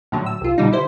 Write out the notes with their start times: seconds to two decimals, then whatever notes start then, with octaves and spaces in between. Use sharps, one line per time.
0.12 A2 D3 F#3
0.26 E6
0.41 C2 F4
0.58 B2 D3 G3 D#4
0.73 E4 C5